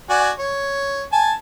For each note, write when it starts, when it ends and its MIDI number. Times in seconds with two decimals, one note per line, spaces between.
0.09 0.31 66
0.09 0.31 74
0.09 0.31 80
0.39 1.03 73
1.12 1.33 80
1.12 1.33 81